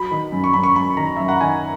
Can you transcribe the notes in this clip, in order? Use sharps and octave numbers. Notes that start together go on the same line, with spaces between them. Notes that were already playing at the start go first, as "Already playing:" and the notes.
Already playing: F#3 B5
D#3
F#2
C#6
F#2 B5
C#6
F#2 B5
D#3 A#5
F#2 E5
F#5
D#3 G#5